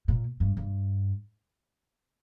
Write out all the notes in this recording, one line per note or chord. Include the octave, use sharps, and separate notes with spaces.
A#2
G2
G2